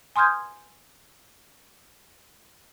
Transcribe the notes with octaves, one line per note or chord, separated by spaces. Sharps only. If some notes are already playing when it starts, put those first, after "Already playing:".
G#5 C6 D#6 F6 G6 G#6